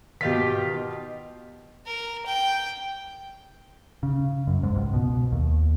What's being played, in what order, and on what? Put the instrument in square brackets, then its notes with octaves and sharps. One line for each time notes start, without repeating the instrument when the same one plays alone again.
[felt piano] B2 B6 [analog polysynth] D#3 F4 G4
[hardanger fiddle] A#4
G5
[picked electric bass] C#3
F#2
G#2
C#2
B2
D#2